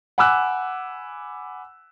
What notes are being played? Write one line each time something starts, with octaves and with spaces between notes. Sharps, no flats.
F#5 G#5 B5 D6 E6 F#6